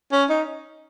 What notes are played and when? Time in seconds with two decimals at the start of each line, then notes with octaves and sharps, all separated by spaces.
0.12 C#4
0.30 D#4